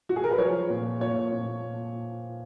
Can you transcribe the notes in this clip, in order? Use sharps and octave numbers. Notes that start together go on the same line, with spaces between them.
F#4
G#4
A#4
B4
F3 C#5
A#2
A#2 C#5
A#2